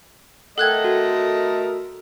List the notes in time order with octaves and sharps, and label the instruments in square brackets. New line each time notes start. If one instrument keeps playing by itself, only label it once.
[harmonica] A3 A#4 D#5 [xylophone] A4 F#6 G#6 [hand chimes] F#5 G5
[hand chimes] F#4